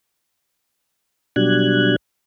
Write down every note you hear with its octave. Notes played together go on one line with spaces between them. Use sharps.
B2 F#3 G3 D4 F#6 G#6